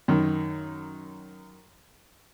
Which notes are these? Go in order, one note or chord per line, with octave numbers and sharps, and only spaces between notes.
F#2 D#3